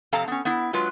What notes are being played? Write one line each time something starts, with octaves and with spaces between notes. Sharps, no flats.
F2 C3 A4 F5 A5 A#5
B3 C#4
B3 E4
F#3 G#3 F4 B4